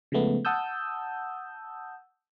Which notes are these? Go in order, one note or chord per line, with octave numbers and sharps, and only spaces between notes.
C#3 F3 G#3 A3 B3
F#5 A5 D#6 E6 G6